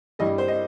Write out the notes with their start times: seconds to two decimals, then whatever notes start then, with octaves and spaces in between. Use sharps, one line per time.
0.19 G2 E3 G3 D#5
0.38 C5
0.48 D#5